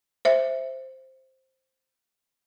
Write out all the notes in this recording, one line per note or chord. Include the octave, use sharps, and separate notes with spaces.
C5 E5